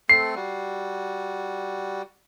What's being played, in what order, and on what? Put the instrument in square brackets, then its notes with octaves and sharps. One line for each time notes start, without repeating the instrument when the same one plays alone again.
[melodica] A3 C4 A4 [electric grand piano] C7
[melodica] G3 F#4